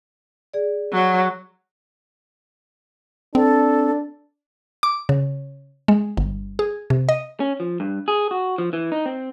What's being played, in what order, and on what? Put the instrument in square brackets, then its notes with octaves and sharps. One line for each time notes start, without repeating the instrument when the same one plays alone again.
[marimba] G#4 D5
[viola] F#3
[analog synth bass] C4 [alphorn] D4 [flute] A4
[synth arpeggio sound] D6
C#3
G#3
G1
G#4
C3
D#5
[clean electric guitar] C#4
F3
G2
G#4
F#4
F3
E3
D#4
C4